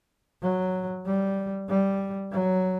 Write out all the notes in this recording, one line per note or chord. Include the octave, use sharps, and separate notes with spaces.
F#3
G3
G3
F#3